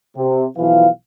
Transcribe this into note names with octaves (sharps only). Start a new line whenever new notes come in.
C3
B1 E3 F3 E4 F4 F5